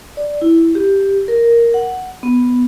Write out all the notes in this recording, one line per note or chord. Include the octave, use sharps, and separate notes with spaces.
D5
E4
G4
A#4
F#5
B3